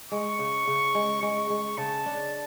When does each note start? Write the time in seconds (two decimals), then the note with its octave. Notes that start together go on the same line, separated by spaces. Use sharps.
0.11 G#3 C#6
0.39 C#3
0.67 C#3
0.95 G#3
1.22 G#3 C#6
1.50 G#3
1.78 C#3 A5
2.06 D4